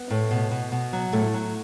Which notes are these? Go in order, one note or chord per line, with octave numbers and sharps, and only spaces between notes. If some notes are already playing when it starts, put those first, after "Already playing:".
Already playing: B3
A2
B2
B2
B2
F#3
A2 A3
F#3